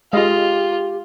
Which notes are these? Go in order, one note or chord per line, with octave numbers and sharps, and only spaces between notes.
G#3 F4 G4 D#5 F5